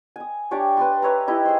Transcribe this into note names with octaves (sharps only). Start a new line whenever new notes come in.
G#5 D#6
D4 G4 C#5 D5
B4 D5 C6
B4 C#5 E5 A#5
D#4 E4 G4 D#5
G#4 C5